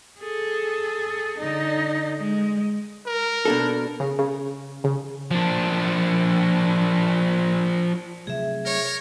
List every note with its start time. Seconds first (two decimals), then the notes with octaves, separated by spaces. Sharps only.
0.20 G#4 A4
1.38 D3 D#4
2.18 G#3
3.06 A#4
3.45 B2 D4 A4
4.00 C#3
4.19 C#3
4.84 C#3
5.31 F3 D4
8.27 C3 F#3 A3 G#4 E5
8.66 A#4 C#5